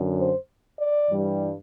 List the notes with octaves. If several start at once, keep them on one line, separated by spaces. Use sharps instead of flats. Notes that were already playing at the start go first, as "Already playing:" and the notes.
Already playing: F#2 D3 F#3
C5
D5
G2 E3 G3